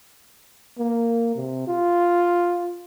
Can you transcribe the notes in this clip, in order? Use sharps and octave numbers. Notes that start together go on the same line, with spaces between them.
A#3
C3
F4